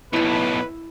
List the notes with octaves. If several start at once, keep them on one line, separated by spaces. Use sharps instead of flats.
B1 A2 E4 B4 E5